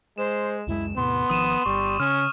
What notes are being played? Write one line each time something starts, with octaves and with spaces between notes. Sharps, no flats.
G#3 C5 E7
C#2 F#2 G#3 E4
E2 A2 C3 B3 C6
G#1 D#3 F3 D#6 D#7 E7
G1 G3 C#6
C#3 C#4 F6